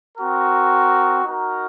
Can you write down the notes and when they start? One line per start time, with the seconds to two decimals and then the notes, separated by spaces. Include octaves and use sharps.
0.17 C4 F#4 A#4
1.25 D#4 F#4 A#4